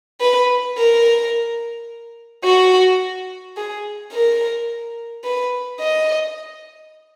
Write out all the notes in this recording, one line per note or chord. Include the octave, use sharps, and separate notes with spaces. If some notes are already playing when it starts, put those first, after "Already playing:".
B4
A#4
F#4
G#4
A#4
B4
D#5